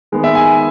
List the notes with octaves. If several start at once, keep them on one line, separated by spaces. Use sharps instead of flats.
D#3 G#3 B3
E5
G#5